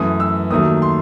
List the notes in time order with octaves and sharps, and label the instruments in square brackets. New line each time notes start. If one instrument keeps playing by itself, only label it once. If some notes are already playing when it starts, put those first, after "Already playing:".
Already playing: [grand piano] F#2 E3 A3 D#6
E6
D#2 D#3 F#3 A3 D#6
C6